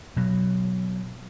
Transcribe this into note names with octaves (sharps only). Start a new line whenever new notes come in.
B2 F#3